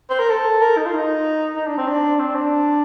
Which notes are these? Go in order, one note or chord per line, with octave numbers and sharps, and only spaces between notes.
C5
A#4
A4
A#4
D#4
F4
D#4
D#4
D4
C4
D4
C4
D4